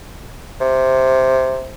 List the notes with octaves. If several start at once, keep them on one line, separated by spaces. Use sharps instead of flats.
C3